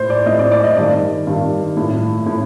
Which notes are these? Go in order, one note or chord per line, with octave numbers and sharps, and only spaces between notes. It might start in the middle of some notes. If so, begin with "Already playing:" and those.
Already playing: A2 C5
D5
A2 D#5
D5
D5
D#5
G2 D#3 D5
G2 D#3
A2
A2